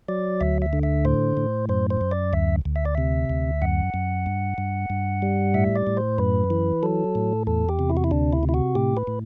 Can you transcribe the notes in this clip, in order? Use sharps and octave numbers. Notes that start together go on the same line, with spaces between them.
F#3 D5
D2 E5
E5
D3
E5
A2 C5
A2
F#2 C5
C5
F#2
D5
D2 E5
D2
E5
D5
C3 E5
D2
F#2 F#5
F#2
G2
G2
G2
G3
A2 E5
D5
A2
C5
F#2 B4
E3
F#3 A4
A2
E2 A4
G4
C3
E4
F#4
E4
D2 D4
E4
C3
E4
F#4
A2 G4
B4
A2